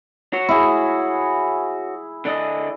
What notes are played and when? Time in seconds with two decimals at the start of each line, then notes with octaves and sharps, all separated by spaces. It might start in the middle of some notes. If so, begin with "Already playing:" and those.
0.33 F#4 C#5
0.49 E4 G#4
2.25 D3 D4 D#5